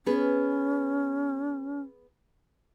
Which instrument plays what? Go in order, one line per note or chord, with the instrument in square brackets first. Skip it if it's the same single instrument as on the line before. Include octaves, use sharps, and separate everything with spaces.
[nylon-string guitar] B3 G#4 B4 [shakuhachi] C#4